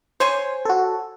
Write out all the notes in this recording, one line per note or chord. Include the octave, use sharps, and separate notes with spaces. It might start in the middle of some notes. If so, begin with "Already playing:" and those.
C5 C#5 G#5 C6
F#4 A4